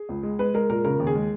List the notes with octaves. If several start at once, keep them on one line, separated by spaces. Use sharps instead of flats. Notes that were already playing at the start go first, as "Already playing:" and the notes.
Already playing: G#4
C#2
G#3
G#3 B4
G#3 A#4
A#2 A#4
C#3 A#4
D#2
G#4
G#3